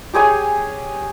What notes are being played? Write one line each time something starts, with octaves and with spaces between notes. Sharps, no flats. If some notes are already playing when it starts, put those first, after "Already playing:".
G4 G#4 C#5 G#5